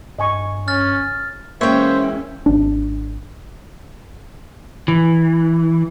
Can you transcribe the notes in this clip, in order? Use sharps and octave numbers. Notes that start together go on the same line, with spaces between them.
G2 D#5 G#5 C#6
C#4 F6 A6
E3 G#3 A#3 C#4 C5 C#5 E5 G5
G#1 D4
E3